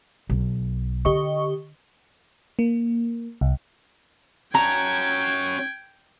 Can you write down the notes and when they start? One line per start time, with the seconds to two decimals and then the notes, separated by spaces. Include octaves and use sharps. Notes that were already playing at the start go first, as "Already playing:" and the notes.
0.30 B1
1.05 D3 G4 D#5 C#6
2.59 A#3
3.41 C2
4.55 C#4 F#4 G5 A#5 G#6